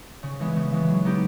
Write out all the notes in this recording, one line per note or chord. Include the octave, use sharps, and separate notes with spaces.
C#3
E3 G#3 B3
C#3
E3 G#3 B3
F#3
B3 D#4 G4